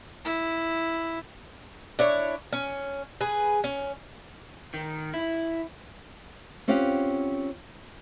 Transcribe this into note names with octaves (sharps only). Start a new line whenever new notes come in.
E4
D4 E4 C#5
C#4
G#4 B4
C#4
D#3
E4
C4 C#4 F4 G4 F5 F#5